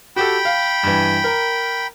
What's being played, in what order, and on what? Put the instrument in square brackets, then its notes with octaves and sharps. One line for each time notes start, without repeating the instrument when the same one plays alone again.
[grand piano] F#4 G4 A4 [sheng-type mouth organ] G5 B5
[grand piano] F5
G2 E3
A#4